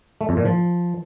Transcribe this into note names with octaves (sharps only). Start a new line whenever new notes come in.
A3
F2
A#2
F3